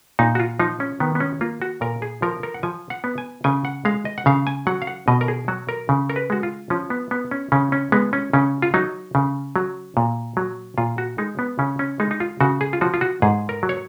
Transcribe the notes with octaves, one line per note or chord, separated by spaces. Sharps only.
A#2 D#4
F#4
F4
F3 D#4
C#4
D#3 B3
B3
C#4
A#3 F4
F#4
A#2 A#4
G#4
F3 A#4
A#4
F#5
F3 G#5
F#5
B3
G#5
C#3 G#5
F#5
G#3 F5
D#5
F#5
C#3 F5
G#5
F#3 F#5
F5
F#5
B2 D#5
A#4
G#4
F#3 F#4
A#4
C#3
A#4
B4
G#3 F#4
F4
F3 C#4
B3
B3
C#4
C#3 C#4
C#4
G#3 B3
C#4
C#3 C#4
F4
F#3 D#4
C#3
F#3
A#2
F#3
A#2 F4
F#4
G#3 D#4
B3
C#3 C#4
C#4
G#3 D#4
D#4
F4
C#3 F#4
G#4
F4
F3 F#4
F4
F#4
G#2 G#4
A#4
F#3
C#5